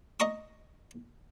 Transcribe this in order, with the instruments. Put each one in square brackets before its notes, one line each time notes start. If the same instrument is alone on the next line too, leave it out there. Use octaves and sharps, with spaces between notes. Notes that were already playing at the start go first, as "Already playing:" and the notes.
[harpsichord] D#5 A#5 C#6 D#6